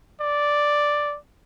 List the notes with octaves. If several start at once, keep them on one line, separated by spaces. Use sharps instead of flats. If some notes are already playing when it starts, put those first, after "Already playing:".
D5